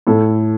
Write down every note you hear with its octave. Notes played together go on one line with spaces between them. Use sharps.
A2 A4